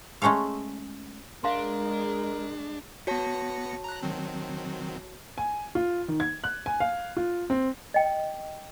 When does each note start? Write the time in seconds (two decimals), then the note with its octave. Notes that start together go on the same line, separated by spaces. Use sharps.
0.22 G#3 A3 C#4 A4 F5
1.44 G#3 D4 A#4 E5 F5 C6
3.07 B3 F#4 C#5 A5 A#6 C#7
3.84 A#5 F#6
4.03 D#3 F#3 C4
5.38 G#5
5.75 F4
6.08 D#3
6.20 G#6
6.44 F#6
6.66 G#5
6.80 F5
7.17 F4
7.50 C4
7.94 D#5 G5